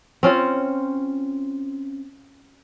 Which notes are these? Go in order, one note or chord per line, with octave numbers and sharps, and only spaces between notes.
C4 C#4 F4